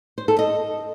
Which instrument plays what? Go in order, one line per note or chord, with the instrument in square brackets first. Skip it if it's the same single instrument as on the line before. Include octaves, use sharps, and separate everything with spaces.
[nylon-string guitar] C5
A4
D#5